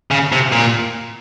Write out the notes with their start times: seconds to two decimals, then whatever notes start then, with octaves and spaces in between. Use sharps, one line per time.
0.11 C#3
0.32 C3
0.52 A#2